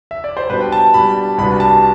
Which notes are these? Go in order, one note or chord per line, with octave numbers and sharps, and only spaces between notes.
E5
D5
C5
B2 G3 D4 B4
G5
A5
B2 G3 D4 B5
C2 B2 G3 B3 D4 B5
A5